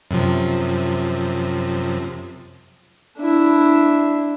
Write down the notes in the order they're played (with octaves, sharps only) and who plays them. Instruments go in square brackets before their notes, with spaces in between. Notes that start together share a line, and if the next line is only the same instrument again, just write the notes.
[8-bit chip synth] F#2 C3 F3
[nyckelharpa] D4 E4